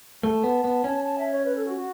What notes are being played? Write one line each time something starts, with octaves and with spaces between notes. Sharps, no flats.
A3 A5
B3
B3
C#4
A5
E5
C#5
B4
A4
F#4
F#4